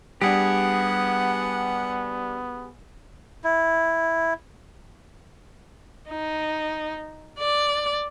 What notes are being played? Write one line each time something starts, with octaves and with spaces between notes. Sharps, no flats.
G3 B3 D4 G4 G#4 F#5
E4
D#4
D5